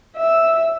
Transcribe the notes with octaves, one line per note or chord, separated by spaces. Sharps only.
E5